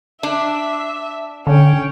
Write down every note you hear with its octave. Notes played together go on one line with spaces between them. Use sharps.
D4 E5
D3 C#4 G5